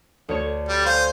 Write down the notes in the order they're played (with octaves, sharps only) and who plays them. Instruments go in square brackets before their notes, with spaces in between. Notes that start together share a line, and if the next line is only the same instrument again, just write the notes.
[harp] D2 C#5
[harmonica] G3
[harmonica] C5 [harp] F5 G#5